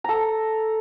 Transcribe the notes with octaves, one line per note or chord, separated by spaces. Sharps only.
A4 A#5